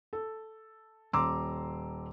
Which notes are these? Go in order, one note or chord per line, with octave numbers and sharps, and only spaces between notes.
A4
D#1 A#5 C6 D6 E6